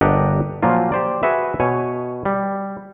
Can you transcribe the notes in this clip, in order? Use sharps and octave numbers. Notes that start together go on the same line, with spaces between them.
G1 D4 G4 A#4 D#5 F#5
A#2 F3 F#3 A#3 F4
G4 C5 D5
F#4 G#4 B4 E5
B2 C#5 G#5
G3